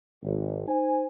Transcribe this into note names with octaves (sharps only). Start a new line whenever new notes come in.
G#1
D#4 C5 G#5